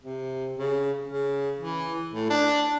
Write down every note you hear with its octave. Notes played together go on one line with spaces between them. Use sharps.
C3
C#3
C#3
E3
A2
D4